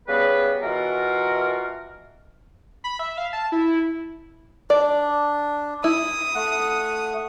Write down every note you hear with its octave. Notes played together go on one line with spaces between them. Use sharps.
C#3 G3 B3 G#4 B4
B2 E3 F4 F#4 A#4
B5
E5
F5
A5
E4
D4 D5
E4 D#6
A3 F#5